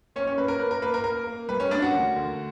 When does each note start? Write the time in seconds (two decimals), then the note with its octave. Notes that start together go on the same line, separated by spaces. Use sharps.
0.16 A#3 C#4 C#5
0.27 C#4 C#5
0.37 A#3 B4
0.48 A#4
0.59 A#3 B4
0.71 A#4
0.82 A#3 B4
0.94 A#4
1.04 A#3 A#4
1.27 A#3
1.49 G3 B4
1.60 C#4 C#5
1.71 A#3 D4 D5
1.82 F#4 F#5
1.93 D2
2.16 D2